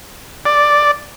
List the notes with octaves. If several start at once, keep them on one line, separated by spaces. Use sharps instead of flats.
D5